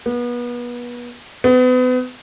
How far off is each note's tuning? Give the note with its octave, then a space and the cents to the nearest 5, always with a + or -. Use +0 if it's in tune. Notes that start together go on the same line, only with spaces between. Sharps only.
B3 -30
B3 +35